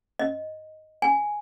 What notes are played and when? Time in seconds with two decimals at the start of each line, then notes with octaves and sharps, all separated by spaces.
0.19 D#5
1.02 G#5